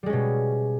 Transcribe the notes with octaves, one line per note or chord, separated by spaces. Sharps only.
B2 G3 G#3 C#4